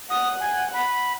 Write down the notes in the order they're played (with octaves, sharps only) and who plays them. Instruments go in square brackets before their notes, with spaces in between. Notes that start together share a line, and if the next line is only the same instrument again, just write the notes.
[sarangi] F#5 [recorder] D#6
[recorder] G#5
B5